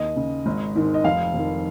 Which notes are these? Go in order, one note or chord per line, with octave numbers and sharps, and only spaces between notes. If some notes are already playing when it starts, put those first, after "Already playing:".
Already playing: D#2 D#5
C#3
G#1
G#2 D#3
D#5
F1 F5
F2 D#3